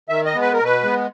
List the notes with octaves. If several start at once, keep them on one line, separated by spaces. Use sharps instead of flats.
D#3 E5
D#5
G#3 B3
B4
A#4
B2
B4
G#3 B3